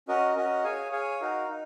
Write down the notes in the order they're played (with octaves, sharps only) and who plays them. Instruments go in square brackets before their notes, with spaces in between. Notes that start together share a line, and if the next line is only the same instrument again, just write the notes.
[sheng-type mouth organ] C#4 F#4 A#4 D#5
C#4 F#4 A#4 D#5
G#4 C#5 F5 G#5
G#4 C#5 F5 G#5
D#4 F#4 A#4 F5
D#4